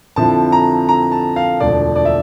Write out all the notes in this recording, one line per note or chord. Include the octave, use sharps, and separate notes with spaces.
F2 D3 F3 C4 E4 A5
A#5
A#5
A5
F5
E1 D2 D3 F3 D5
D5
E5